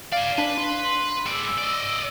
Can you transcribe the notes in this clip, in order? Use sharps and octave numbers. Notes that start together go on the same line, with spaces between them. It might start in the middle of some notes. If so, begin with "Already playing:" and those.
D5 F5 G#5
D4 B4
C6
G#3 D5 E6
D5 D#5